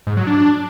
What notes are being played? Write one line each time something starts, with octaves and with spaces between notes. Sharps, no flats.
G#2
F#3
D4